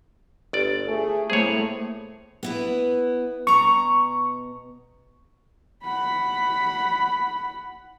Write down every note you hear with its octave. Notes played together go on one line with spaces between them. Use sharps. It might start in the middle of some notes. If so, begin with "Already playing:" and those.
G1 D5
A3 G#4
A2 A3 A#3 C4 G#4 C#5
B3 E4 B4
B2 A#5 C#6
F#5 B5